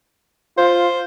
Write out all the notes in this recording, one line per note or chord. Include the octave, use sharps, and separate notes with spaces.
F4 C5